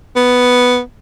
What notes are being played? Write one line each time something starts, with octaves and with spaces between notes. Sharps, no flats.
B3